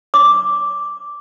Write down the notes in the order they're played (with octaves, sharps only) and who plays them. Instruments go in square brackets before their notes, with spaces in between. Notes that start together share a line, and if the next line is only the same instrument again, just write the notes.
[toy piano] D6